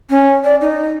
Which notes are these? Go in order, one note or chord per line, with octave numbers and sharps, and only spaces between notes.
C#4
D5
D#4